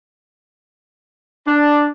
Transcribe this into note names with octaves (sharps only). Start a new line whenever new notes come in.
D4